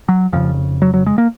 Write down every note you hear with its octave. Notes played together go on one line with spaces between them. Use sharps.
F#3
F1 F2 C#3 F3
F#3
F#3
G#3
A#3